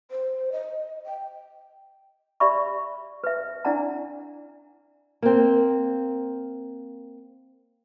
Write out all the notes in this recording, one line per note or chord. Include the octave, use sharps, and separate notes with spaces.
C5
D#5
G5
G4 D5 E5 B5 C#6
B4 E5
D4 E4 D5 F#5 A#5
A#3 C4